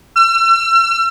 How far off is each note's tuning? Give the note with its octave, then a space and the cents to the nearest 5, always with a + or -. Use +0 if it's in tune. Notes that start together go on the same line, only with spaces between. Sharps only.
E6 +40